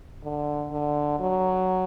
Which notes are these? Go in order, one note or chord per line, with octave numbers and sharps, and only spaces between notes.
D3
D3
F#3